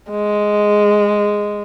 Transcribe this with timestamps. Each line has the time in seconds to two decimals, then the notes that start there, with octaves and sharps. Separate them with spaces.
0.11 G#3